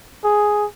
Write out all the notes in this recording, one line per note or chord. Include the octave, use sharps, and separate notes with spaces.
G#4